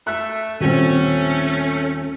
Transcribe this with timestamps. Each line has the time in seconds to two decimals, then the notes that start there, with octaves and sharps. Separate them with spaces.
0.07 A3 E5 F#6
0.61 D#1 A3 C4 C#4